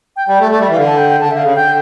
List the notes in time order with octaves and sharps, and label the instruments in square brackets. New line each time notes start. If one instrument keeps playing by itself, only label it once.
[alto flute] G5
[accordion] G3 [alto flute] G5
[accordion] A3
[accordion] A3 [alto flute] D5
[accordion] G3
[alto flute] E5
[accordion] E3
[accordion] D3 [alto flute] F5
[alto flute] A5
G5
G5
[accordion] D3 [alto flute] A5
[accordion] D3 [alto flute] E5
[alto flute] F5
[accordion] C#3
[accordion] D3 [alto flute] G5